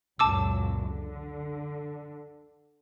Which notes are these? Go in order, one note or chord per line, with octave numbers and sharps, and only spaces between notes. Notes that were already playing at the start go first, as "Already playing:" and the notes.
C#2 F#2 A#2 A5 D6 E6
D3